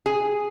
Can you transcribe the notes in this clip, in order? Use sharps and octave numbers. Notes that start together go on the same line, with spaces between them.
G#4